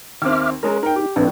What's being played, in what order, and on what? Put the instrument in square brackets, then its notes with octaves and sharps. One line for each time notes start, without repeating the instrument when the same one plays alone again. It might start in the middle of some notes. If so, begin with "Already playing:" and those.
[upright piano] D#2 C4 [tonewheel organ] E5 D6 F6
[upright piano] G#3 C#4 [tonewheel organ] A#4 A#5
[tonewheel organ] D#4 [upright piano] A#4 G5
[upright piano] G4
[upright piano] A#1 A2 [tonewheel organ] C4 D4 B4